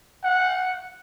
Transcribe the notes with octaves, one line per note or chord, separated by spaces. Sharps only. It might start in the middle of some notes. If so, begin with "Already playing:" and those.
F#5